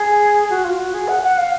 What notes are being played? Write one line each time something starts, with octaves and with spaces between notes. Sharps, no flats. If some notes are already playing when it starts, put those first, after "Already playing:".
Already playing: G#4
F#4
F4
F#4
G#4
F#5
F#5
F5